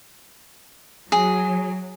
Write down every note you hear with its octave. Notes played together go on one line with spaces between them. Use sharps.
F#3 G#4